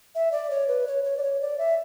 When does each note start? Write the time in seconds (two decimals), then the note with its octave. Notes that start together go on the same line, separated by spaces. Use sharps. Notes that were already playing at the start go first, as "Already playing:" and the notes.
0.15 E5
0.32 D5
0.50 C#5
0.68 B4
0.87 C#5
1.04 C#5
1.17 D5
1.23 C#5
1.41 D5
1.58 E5